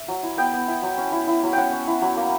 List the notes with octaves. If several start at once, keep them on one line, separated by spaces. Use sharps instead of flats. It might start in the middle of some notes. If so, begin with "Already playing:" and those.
Already playing: E5
F#3
E4
B3 G5
B3
E4
F#3
C#4
E4
E4
F#3
C#4 F#5 G5
C#4
E4
F#3
A#3